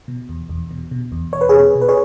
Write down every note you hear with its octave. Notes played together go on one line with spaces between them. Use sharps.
B2
E2
E2
B2
B2
E2
E2 C#5
B4
G#4 C#5
B2
B2
B4
G#4 C#5